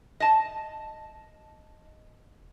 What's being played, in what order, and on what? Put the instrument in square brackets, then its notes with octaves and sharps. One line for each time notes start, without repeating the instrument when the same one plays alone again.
[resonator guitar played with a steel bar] D#5 A5